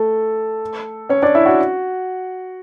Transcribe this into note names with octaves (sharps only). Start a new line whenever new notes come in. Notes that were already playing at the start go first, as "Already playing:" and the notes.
Already playing: A3 A4
C#4 C#5
D4 D5
E4 E5
F#4 F#5